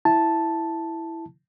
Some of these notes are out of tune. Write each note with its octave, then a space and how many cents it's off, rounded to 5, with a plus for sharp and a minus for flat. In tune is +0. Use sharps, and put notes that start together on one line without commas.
E4 +0 A5 +0